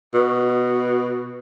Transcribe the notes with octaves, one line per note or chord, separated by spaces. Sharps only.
B2